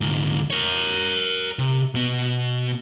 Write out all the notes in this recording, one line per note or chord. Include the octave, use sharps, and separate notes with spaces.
D2 G#2
A#4 C#5
C3
B2 B3